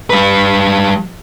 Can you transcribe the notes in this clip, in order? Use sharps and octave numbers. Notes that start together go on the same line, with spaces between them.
G3 B4